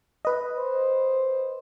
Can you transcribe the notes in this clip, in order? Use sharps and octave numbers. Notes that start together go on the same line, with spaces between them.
B4 D#5
C5